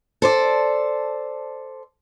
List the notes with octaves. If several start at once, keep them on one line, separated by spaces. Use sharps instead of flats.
A4 C5 D5